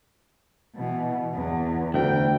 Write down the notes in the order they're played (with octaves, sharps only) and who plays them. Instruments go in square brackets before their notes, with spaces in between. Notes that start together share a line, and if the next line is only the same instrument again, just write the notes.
[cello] B2 E3
E2
[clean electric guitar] D2 [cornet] G5